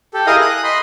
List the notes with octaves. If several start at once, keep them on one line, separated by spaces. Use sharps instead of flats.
G4 A4
E4 G#4 A#4 D#5 F5 D#6
D#6 F#6
D#5 B5 C6